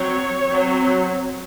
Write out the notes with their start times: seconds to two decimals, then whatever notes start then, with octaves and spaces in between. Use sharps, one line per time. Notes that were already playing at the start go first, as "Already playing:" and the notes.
Already playing: F#3 C4 C#5
0.46 F#3 C4